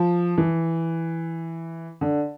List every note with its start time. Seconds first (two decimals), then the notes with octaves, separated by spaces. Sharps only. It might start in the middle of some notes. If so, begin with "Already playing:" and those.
Already playing: F3
0.38 E3
2.01 D3